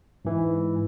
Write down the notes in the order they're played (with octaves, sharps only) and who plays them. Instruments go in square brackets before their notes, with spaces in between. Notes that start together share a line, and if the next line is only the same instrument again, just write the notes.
[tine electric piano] G#2 E3